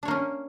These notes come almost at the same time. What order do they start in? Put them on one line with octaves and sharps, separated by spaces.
D4 C#5 A#3 C#4